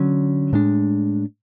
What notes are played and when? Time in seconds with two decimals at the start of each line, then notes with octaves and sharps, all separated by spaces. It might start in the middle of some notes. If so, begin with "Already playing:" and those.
Already playing: D3 F#3 C#4
0.53 A2 G#3 D4